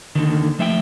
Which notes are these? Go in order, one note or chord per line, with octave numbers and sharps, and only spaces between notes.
D#2 D3 D#3
F3 A3 E5 F5 G5